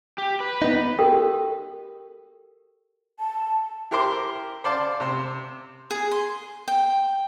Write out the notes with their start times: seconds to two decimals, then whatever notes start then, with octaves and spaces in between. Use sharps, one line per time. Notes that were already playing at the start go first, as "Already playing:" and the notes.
0.18 G4
0.40 B4
0.62 B3 D#4
0.99 F#4 G4 A4 A#4 G5
3.19 A5
3.91 E4 G4 A#4 C5 C6 D6
4.64 C5 D5 F5 A5 D6
5.00 C3 C5
5.91 G#4
6.11 C6
6.68 G5